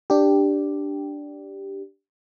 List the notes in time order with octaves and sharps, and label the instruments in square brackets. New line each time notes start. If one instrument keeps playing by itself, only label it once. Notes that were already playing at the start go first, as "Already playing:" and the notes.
[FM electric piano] D4 G4